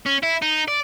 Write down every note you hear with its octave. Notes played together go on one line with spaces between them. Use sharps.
C#4
E4
D#4
D5